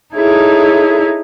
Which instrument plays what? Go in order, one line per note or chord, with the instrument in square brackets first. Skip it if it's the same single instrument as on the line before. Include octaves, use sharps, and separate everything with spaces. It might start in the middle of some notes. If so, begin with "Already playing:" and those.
[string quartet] D#4 E4 G#4 A4 C#5